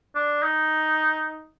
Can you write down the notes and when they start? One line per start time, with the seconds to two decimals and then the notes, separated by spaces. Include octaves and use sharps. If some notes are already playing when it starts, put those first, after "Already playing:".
0.15 D4
0.43 D#4